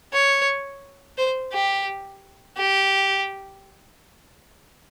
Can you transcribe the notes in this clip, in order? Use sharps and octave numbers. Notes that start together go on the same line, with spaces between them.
C#5
C5
G4
G4